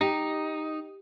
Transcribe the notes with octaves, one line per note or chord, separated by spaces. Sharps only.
D#4 G4